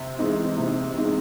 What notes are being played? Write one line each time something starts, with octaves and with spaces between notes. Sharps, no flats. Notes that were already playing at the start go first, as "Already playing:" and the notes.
Already playing: C3
E3 G#3 C4 D#4
C3
E3 G#3 C4 D#4